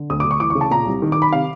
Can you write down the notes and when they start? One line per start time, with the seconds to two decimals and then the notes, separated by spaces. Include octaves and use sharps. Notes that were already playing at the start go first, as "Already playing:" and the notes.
Already playing: D3
0.10 D2 D#6
0.20 D2 D6
0.31 C#6
0.40 E3 D6
0.50 C#3 C#6
0.61 A5
0.71 A#2 A#5
0.86 C2
1.02 D#3
1.12 D#3 D6
1.22 B5
1.32 C3 F5